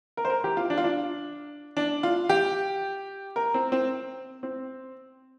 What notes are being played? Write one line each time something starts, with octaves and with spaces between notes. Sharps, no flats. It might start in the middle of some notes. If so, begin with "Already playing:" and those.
A#4
C5
A#4
G4
F4
D4
F4
D4
D4
F4
G4
A#4
C4
C4
C4